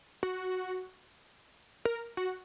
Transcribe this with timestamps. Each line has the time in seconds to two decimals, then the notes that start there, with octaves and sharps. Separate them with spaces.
0.23 F#4
1.85 A#4
2.17 F#4